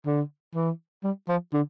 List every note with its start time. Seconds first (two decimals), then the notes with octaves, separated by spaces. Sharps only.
0.06 D3
0.55 E3
1.04 G3
1.29 F3
1.54 D3